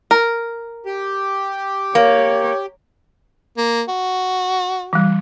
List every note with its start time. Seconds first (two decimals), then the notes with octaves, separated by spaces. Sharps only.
0.11 A#4
0.86 G4
1.95 A#3 C#5
3.57 A#3
3.88 F#4
4.93 E3 G3